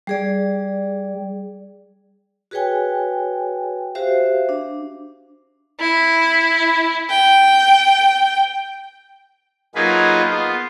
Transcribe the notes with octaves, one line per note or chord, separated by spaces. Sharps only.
G3 G#4 D5
F#4 G#4 B4 C#5 G5 G#5
F#4 G4 C5 E5 F5
D4
E4
G5
F#3 A#3 D#4 F4 G#4 B4
B3 F4